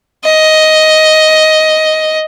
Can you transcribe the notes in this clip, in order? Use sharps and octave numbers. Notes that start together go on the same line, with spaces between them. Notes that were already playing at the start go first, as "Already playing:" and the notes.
D#5